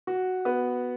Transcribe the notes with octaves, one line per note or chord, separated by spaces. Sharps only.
F#4
B3